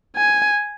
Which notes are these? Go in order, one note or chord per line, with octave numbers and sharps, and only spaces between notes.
G#5